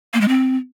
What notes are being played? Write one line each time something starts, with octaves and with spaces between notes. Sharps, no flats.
A#3
G#3
C4